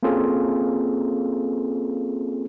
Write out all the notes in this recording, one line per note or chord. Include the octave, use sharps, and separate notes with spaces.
A#3 C4 C#4 F4 G#4 A4